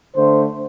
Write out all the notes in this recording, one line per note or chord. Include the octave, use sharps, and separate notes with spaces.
D3 A3 C5